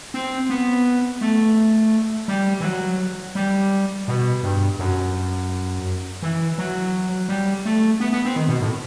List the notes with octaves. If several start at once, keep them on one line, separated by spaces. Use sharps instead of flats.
C4
B3
A3
G3
E3
F#3
G3
B2
G2
F#2
E3
F#3
G3
A3
B3
B3
C4
D#3
B2
A2